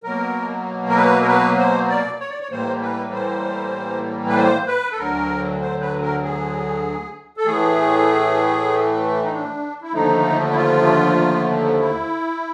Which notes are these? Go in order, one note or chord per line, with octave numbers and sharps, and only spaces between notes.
B2 F#3 A#3 A#4
A#4
B4
A#4
B4
C5
D5
C#5
D5
C#5
A2 E3 G3 A#3 C5
B4
C5
B4
C5
B4
A4
D2 D3 F#3 A#4
C5
B4
A#4
G#4
A4
A2 E3 A3 G#4
D#4
D4
E4
D#2 D3 F3 A3 D#4
E4
F4
E4